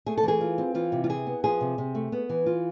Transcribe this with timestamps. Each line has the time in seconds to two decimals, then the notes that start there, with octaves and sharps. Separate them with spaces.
0.06 A3 G#4
0.17 A4
0.23 E3 G#4
0.41 F4
0.58 C4
0.74 E3 F4
0.92 C3
1.04 F4
1.09 E4 G#4
1.26 B3
1.44 F3 G#4
1.61 C3
1.78 C3
1.95 A3
2.12 B3
2.29 E3
2.46 F4